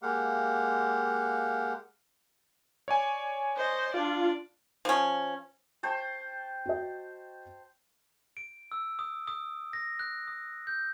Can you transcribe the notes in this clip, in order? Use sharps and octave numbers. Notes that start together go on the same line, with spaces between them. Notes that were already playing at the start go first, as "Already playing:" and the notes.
G#3 A#3 G4 F5 F#5
C#5 D5 G#5
C5 D#5
D4 F4 D5
F3 C#4
C5 G5 A5
F#4 D#5
D7
E6
D#6
D#6
A#6
F#6
D#6
G6